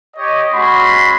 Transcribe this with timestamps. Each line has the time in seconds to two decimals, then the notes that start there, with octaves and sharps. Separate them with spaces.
0.16 G4 C#5 D#5
0.52 G#3 C#4 F#4 B5 C6